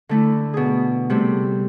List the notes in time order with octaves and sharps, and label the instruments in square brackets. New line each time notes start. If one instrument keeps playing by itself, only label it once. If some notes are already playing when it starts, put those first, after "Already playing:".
[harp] D3 A3 E4
B2 G#4
C3 G3 A3